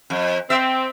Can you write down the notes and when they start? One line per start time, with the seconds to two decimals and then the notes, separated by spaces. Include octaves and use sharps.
0.10 F2
0.50 C4 E5